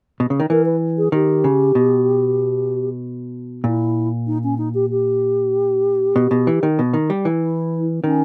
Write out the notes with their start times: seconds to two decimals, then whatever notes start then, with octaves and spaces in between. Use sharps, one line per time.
0.20 B2
0.30 C#3
0.40 D#3
0.50 E3 A#4
0.65 B4
0.97 G#4
1.12 D#3 G4
1.44 C#3
1.75 B2
3.64 A#2 E4
4.27 D#4
4.43 C#4
4.58 D#4
4.74 G4
4.90 G4
6.16 B2
6.31 B2
6.47 E3
6.63 D#3
6.79 B2
6.94 D#3
7.10 G3
7.25 E3
7.41 E4
8.00 B3
8.03 D#3 C#4